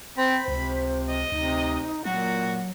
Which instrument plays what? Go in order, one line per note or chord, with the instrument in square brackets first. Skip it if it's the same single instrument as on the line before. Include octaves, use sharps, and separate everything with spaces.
[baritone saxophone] C4 [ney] C5 [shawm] B5
[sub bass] C#2 [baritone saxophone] C3 [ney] C5
[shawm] D#5
[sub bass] D2 [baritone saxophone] C3 [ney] D#4
[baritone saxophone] A#2 [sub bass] F#3 [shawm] F#4 [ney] F#5